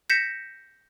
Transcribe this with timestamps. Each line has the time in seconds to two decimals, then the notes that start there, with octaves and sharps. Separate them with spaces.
0.10 G6 A#6 B6 C#7 E7